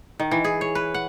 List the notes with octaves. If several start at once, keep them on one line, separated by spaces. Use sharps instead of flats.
D#3
E3
G#4
C#5
B4
F#5